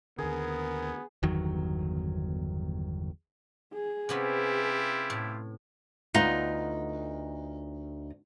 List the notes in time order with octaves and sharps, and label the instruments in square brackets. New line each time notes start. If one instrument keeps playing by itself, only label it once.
[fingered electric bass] D#2 D3 [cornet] B3 [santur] G#4 [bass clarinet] A#4
[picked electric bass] G1 E2 D#3 F#3
[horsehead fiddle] G#4
[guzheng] C3 B3 C#4 [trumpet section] E4 F4 G4
[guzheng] A2
[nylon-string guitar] D2 B3 F4 [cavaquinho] D#4